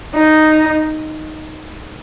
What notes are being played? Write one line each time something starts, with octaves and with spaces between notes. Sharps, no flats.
D#4